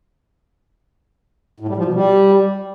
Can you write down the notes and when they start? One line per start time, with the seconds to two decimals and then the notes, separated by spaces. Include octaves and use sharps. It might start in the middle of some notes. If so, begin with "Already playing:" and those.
1.60 A2
1.68 G3
1.77 F3
1.85 B2
1.93 G3